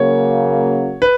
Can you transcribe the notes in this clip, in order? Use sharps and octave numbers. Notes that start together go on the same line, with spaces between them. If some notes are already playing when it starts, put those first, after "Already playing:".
Already playing: C#3 F#3 A#3 C#5
B4